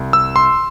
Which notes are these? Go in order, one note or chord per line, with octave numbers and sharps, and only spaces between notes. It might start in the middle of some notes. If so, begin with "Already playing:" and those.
Already playing: C2
E6
C6